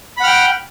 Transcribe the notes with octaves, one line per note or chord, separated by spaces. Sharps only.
F#5 G5 B5 F6